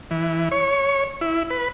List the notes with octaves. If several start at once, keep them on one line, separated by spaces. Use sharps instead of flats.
E3
C#5
E4
B4